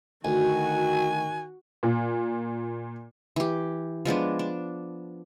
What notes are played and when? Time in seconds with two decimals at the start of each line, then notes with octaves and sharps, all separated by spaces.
0.25 D2 D#3 F#4 G#5
1.83 A#2
3.36 E3 G4
4.05 F3 G#3 B3 D4
4.39 D4